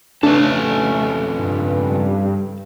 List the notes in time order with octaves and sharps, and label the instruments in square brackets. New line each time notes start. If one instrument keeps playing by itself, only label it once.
[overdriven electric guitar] F2 C#3 [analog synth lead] A3 [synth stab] D4 [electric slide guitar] A4 B4
[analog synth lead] G2